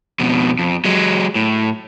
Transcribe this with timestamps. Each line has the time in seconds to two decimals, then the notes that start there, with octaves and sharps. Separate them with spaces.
0.19 F2 B2
0.59 F2
0.85 F#3 G#3
1.35 A2